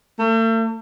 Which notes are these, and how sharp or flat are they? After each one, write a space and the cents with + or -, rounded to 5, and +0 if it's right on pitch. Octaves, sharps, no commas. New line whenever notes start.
A3 +40